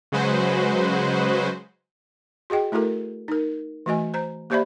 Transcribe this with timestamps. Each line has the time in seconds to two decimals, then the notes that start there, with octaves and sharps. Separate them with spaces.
0.12 C#3 F#3 G#3 F#4 B4 C5
2.50 F#4 G#4 D#5 G5
2.72 A3 E4 F#4 A4 A#4
3.28 D#4 A#4
3.86 E3 A3 F#4 D#5 G#5
4.14 C5 A#5
4.50 A#3 G4 C5 D5 E5 B5